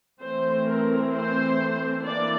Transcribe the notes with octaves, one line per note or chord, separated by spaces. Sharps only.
E3 A3 C4 C5
A#4
C5
E3 A#3 D4 D5